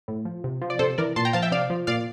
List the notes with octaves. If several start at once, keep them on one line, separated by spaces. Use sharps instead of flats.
A2
F3
C3
F3
D5
C3 A4 C5
E3 A#4 D5
A#2 A5 C6
G5 A#5
F3 F5 A5
E5 G5
C3 D5 F5
F3
A#2 D5 F5